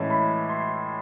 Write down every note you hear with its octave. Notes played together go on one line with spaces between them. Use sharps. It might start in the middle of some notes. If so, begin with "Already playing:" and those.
Already playing: A2 E3 G#3 C#4 E4
B5
C6